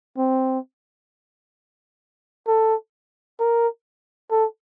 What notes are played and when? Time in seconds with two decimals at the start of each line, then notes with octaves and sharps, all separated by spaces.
0.17 C4
2.47 A4
3.40 A#4
4.31 A4